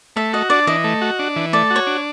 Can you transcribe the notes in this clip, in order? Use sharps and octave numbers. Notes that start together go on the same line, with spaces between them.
A3 E5
F#4 D#5
D4 D5
E3 D#5
A3
F#4
D4
E3
A3 D5
F#4
C#5
D4